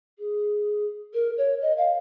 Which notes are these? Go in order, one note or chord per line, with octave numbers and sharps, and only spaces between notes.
G#4
A#4
C#5
D#5
F5